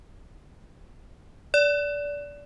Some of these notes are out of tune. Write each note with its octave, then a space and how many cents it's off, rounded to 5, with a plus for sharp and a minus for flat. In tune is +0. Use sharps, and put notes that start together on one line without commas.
D5 -20